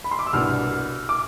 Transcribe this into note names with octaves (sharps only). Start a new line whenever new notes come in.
B5
C6
D6
E6
C2 B2 B3 D4 F6
D6